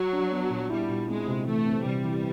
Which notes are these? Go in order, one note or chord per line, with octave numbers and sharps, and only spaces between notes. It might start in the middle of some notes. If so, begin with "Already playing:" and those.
Already playing: F#3 F#4
D4
B3
A#2
G3 E4
A#2
G#3 C4
C3
E3 A3
C4
C3 G3
E3